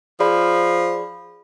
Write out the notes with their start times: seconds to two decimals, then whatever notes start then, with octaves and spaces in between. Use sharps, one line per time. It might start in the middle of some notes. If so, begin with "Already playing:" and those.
0.20 F3 G#4 D5 B5